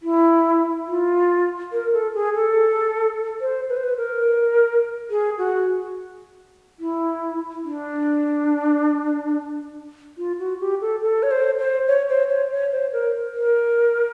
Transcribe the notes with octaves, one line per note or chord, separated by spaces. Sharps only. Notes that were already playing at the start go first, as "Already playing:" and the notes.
E4
F4
A#4
A4
G#4
A4
C5
B4
C5
B4
A#4
G#4
F#4
E4
D4
F4
F#4
G4
A4
A4
C#5
C5
C5
C#5
C5
C#5
C#5
C5
A#4
A#4